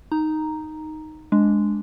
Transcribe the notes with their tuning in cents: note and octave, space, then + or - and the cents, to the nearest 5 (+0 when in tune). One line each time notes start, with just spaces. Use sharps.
D#4 +0 A#5 +0
G#3 +0 D4 -5